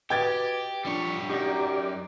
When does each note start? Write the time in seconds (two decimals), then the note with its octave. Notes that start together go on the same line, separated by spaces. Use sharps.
0.10 F#4 G4 B4 D#5 G5 G#6 A6
0.85 F3 G3 D4 C#5
1.29 F#2 D#4 F#4 G4 D5